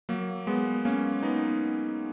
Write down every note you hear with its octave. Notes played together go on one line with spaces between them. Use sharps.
F#3 A#3
G#3 B3
A#3 C#4
B3 D#4